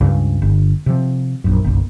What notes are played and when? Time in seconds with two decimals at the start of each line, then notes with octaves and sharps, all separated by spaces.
0.01 C#2 G2 C#3
0.42 G1
0.86 C3 F3
1.44 A#1 F#2
1.64 F#1 B1